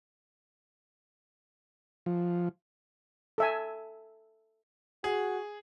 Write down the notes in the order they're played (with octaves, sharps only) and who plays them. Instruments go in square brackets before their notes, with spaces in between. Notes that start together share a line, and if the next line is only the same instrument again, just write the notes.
[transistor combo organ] F3
[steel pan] A4 E5 G#5
[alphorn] F#4 [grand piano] G#4